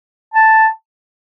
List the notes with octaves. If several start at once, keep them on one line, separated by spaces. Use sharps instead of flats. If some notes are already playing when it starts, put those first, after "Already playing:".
A5